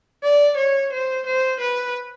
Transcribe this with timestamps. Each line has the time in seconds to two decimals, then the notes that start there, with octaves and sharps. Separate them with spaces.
0.23 D5
0.57 C#5
0.93 C5
1.26 C5
1.61 B4